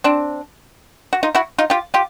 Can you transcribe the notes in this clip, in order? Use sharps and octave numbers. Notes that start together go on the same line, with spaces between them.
C4 D4
F#4
D#4 F4
E4 F#4
D#4 F4
F4 G4
F4 G4